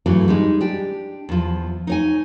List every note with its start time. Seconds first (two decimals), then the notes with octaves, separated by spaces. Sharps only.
0.06 G2 E3 F#3 A3 C#4
0.28 G3 G#3 D#4
0.61 D4 G4
1.29 E2 F3
1.87 D#4 C#5 G#5